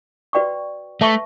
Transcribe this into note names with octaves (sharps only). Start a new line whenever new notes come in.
F#4 B4 D5 G5 C#6
A3 B4 E5 A5 C#6